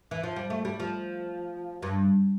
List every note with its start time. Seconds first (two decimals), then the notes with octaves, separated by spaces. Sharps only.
0.11 E3
0.23 F3
0.36 G3
0.50 A3
0.65 G3
0.80 F3
1.83 G2